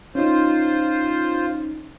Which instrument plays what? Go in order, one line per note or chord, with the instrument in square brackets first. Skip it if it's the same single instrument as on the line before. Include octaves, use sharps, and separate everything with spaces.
[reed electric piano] C#4 D#4 [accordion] F4 C5